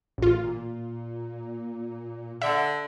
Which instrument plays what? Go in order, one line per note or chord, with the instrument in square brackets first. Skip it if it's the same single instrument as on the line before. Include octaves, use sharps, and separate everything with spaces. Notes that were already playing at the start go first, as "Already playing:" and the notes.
[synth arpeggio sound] A1 F4
[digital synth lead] A#2
[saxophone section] D3 [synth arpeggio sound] E5